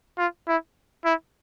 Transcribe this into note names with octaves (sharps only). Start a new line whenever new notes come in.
F4
E4
E4